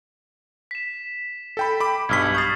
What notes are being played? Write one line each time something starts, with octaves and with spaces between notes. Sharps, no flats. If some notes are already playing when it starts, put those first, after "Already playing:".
B6 E7
A4 G5 B5
B5 D6
B1 G2 E6 F6 G#6 B6
C#6 D#6 G6 A6 C7